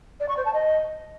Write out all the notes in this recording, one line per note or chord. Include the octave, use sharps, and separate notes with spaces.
D5
C#6
C5
A5
D#5